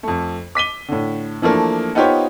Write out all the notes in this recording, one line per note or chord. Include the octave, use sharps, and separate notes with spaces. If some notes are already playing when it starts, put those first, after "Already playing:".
F2 A3
D6 B6 D#7 G7
A2 D3
E3 F3 A3 A#3 D4
B3 D#4 F4 G4 C5 C#5